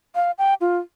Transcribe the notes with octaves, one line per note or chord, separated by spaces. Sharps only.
F5
G5
F4